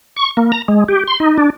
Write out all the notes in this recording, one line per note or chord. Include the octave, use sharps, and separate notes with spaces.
C#6
A#3
A#5
G#3
G4
C6
D#4
D4